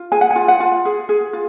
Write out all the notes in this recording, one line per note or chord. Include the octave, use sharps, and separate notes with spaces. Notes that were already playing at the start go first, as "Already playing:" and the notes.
Already playing: F4
G#4 G#5
F#5
G#5
F4
F#5
F4
G#4
G#4
F4